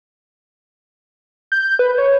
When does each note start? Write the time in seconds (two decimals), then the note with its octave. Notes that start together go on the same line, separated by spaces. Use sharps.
1.52 G6
1.79 B4
1.98 C#5